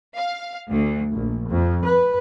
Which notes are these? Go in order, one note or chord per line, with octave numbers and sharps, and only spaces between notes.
F5
D2
A#1
F2
B4